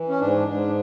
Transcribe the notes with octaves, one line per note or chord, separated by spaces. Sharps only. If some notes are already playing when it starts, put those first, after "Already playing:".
Already playing: E3
C#4
G#2 D4
G#2 D4